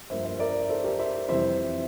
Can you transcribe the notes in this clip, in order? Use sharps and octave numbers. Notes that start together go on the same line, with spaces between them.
G2 F3 A#3 C5 E5
C5 E5
E5
A#4 D5
A4 C5
G4 A#4
C5 E5
F2 C3 E3 G3 C4 C5 E5